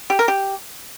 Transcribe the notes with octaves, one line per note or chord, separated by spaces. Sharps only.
G4
A#4
G4